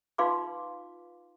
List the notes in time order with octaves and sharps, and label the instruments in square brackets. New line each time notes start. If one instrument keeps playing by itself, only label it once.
[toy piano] D#4 F4 B4 F5 C6 D6